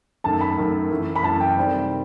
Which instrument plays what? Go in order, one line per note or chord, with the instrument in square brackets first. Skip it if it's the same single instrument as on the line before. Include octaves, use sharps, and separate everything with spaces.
[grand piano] F#2 D#3 A3 [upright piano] A5
[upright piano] B5
[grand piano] F#2 D#3 A3
F#2 E3 A3
[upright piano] B5
[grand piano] F#2 E3 A3 [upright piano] A5
[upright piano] G5
[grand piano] C3 D#3 G3 C4